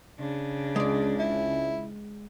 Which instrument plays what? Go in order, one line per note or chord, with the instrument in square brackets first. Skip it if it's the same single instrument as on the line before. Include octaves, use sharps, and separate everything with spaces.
[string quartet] C#3 D4
[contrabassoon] C#2 [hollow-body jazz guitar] G#3 D5
[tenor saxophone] E4